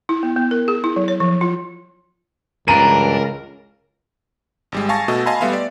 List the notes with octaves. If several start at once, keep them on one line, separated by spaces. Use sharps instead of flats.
E4
B3
B3
A#4
G#4
E4
F#3
C#5
F3
F4
C#2 G2 E3 D4 A#4 A#5 D#7
G#1 G3 G#3
F5 G#5 A5 C#6 A6 A#6
B2 A3 F#4 D#5 E6 A#6
D#5 F5 G#5 A5 B5 C6
G3 A3 B3 E5 F5
D5